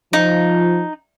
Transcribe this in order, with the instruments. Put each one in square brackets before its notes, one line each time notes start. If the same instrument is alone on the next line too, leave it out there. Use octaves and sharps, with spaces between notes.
[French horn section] F3 [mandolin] D#4